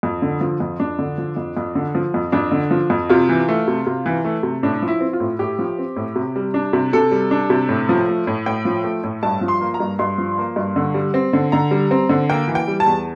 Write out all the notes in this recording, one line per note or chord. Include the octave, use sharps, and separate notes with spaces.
F2
D3
F3
F2
F2 D4
D3
F3
F2
F2
D3
F3
F2
F2 D4
D3
F3
F2
C3 F4
E3
A3
C3
C3
E3
A3
C3
A2 D4
F3
E4
C4
F4
A2
A2 G4
F3
C4
A2
C3
G3
D4
C3
C3 A4
G3
D4
C3
A2
F3
A3
A2
A2 G5
F3
A3
A2
G2 A5
F3
C6
A#3
A#5
G2
G2 C6
F3
A#3
G2
D3
G3
C4
D3
D3 A#5
G3
C4
D3
A#3 G5
E3
G5
G3
A5
E2